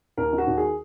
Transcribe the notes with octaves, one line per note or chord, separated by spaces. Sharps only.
D#2 A#4
D#3
F#4
D#2
G#4